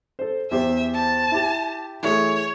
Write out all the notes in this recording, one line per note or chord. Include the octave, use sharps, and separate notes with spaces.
A4 C5
E2 G4 C5 E5
A5
E4 G4
E3 A3 G#4 C#5